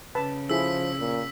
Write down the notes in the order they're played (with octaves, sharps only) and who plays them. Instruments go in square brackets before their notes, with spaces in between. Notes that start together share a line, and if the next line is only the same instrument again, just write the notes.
[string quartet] C#3 [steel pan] B4 A5 B5
[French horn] F3 [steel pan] E4 G#4 A4 [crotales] E6 B6
[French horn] A#2